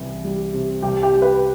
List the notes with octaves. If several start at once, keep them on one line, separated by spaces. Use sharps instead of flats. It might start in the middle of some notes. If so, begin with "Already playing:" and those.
Already playing: C2 E3
G3
C3
C2 G4
G4
G3
B4